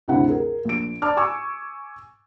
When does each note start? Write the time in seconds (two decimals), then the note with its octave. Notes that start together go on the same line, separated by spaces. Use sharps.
0.08 D2 G2 C3 C4 E4 F#5
0.28 G#4 A#4
0.65 A#1 D7
1.02 D5 A5 D6 F6
1.17 G#5 C#6 D6 E6